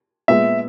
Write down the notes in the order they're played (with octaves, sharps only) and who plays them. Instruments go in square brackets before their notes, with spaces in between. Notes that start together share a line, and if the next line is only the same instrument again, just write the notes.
[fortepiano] A#2 G#3 B3 [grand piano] E5